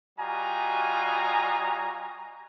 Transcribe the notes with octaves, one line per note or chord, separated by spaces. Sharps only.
G3 F4 F#4 D#5 G#5 A#5